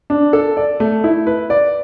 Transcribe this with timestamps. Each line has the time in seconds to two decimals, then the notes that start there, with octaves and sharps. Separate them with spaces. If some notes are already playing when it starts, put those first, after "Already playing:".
0.10 D4
0.33 A4
0.57 D5
0.80 A3
1.04 E4
1.27 B4
1.50 D5